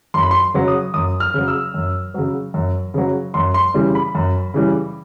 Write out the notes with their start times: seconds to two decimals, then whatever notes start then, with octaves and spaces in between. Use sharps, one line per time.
0.14 F#2 C6
0.22 B5
0.31 C6
0.54 C#3 F#3
0.68 D#6
0.94 F#2 D#6
1.20 F6
1.34 C#3 F#3
1.48 E6
1.74 F#2
2.14 C#3 F#3
2.54 F#2
2.94 C#3 F#3
3.34 F#2 C6
3.54 C6
3.74 C#3 E3 G3
3.95 B5
4.15 F#2
4.54 C#3 E3 G3